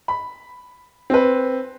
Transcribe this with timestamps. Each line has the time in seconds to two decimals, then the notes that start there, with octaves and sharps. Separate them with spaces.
0.08 B5
1.10 C4 B4